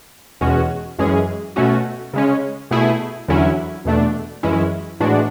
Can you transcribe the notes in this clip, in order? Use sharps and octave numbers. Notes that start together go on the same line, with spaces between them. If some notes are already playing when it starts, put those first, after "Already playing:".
E2 B2 G#3 C#4 F#4
F#2 E3 G#3 C#4 G#4
B2 A3 C#4 F#4
C#3 G#3 C#4
B2 A3 E4 G#4
E2 D3 F#3 C#4 E4
E2 B2 A3 D4
F#2 E3 G#3 C#4 E4
A2 E3 G#3 D4 F#4